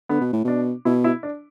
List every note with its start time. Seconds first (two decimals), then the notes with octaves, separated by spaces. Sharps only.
0.09 D3 B3
0.21 B2
0.33 A2
0.45 B2 D4
0.85 B2 E4
1.04 E4
1.23 D4